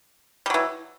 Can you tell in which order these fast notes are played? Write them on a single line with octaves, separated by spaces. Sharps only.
G3 F#3 E3